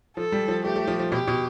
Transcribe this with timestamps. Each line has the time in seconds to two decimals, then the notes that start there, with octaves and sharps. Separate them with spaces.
0.17 F3 A4
0.32 G3
0.48 F3
0.65 A3 G4
0.76 A3
0.87 F3
0.99 F3
1.12 B2 G4
1.27 B2